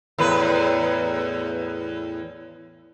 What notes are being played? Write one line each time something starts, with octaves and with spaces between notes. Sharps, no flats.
E2 A2 B4